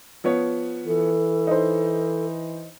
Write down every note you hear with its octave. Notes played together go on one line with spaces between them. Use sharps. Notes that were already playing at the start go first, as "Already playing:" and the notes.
F3 B3 C#5
E3 A4
D#4 C5